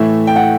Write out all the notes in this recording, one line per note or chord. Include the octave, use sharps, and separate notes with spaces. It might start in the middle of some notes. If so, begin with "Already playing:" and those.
Already playing: A2 E3 A3 E5
G5
F#5